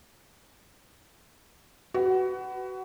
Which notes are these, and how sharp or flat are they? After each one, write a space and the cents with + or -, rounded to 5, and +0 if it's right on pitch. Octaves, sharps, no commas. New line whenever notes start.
F#4 +25 B4 +15